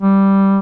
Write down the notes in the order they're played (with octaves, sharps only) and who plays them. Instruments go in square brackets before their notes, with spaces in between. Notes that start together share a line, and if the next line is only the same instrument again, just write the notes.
[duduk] G3